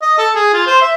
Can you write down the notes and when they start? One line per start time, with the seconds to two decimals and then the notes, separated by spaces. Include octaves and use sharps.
0.02 D#5
0.18 A4
0.35 G#4
0.54 F4
0.67 C5
0.81 E5